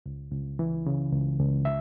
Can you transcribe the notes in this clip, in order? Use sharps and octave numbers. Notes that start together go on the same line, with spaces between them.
C#2
C#2
E3
C#3
C#2
C#2
E5